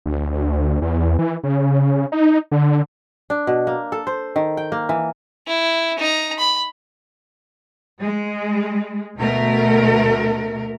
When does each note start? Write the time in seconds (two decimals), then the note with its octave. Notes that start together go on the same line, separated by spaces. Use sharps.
0.06 D2
0.82 E2
1.19 E3
1.43 C#3
2.12 D#4
2.51 D3
3.30 D4
3.47 B2
3.67 A#3
3.92 A4
4.07 C5
4.36 D#3
4.57 G5
4.72 A#3
4.89 E3
5.47 E4
5.98 D#4 A#5
6.39 B5
8.00 G#3
9.17 D2 B2 A3 A#4